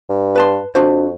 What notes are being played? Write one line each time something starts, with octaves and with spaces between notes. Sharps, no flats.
G2
B4 A5 C6
F2 D4 F#4 C5